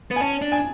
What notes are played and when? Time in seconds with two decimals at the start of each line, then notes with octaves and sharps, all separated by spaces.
0.11 B3
0.16 G#5
0.20 C#4 A5
0.42 D4
0.52 G#5